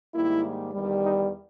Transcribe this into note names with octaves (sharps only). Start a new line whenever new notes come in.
G#2 D#3 G3 A#3 E4
E2 D#3 G3
D#4